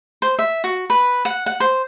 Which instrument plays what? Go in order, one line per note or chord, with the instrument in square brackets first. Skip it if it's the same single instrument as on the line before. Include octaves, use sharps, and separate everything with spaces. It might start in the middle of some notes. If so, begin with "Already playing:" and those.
[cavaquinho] C5
E5
F#4
B4
F#5
F#5
C5